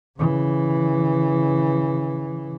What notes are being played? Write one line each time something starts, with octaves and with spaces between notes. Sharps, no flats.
C#3 E3